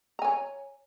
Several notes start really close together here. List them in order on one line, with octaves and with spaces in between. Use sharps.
A#5 G#5 C#5